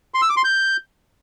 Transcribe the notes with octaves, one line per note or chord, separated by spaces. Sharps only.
C6
E6
D6
C6
G6